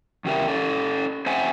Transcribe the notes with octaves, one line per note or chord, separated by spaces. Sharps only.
E2 C#3 G4 A#4 E5
C#4 A4
C4 C5 E5 F#5 G#5